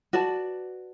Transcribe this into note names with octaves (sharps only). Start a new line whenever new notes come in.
F#4 B4 D5 A5